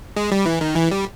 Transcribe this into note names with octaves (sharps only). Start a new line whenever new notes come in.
G#3
G3
E3
D#3
E3
G3